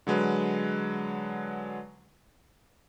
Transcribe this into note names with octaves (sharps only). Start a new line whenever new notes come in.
D3 F#3 G#3 B4